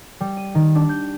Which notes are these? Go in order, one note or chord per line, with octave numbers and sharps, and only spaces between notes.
G3
D#7
D#3
D4
G6